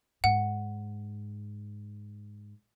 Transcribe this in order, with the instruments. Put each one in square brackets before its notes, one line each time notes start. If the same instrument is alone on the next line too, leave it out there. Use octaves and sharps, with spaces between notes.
[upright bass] G#2 [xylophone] F#5